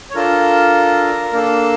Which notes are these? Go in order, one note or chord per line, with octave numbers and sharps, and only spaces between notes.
C#5
D4 F4 A4 A#4
A#3 D4 A4